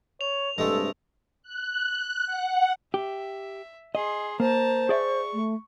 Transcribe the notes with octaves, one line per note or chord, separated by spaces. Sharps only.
C#5 F7
G2 C3 G#3 A3 A4
F#6
F#5
G4 E5
G#4 D#5 C6
A#3 C5 A5 A#5
G#4 D5 E5 C#6
A3